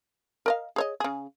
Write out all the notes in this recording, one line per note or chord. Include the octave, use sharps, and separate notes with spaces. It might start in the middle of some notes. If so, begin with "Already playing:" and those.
A#4 D#5 F5
G#4 C#5 D#5
C#3 G#4